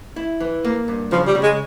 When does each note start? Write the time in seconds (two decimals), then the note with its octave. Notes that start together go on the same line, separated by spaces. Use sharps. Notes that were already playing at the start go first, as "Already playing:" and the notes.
0.16 E4
0.40 E3
0.65 A#3
0.88 G2
1.11 C#3 F3
1.27 G3
1.35 C#3
1.43 G#3